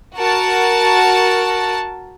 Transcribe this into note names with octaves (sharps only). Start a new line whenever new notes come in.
F#4 A#4 A5